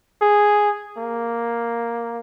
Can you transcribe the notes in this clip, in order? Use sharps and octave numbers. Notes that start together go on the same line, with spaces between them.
G#4
A#3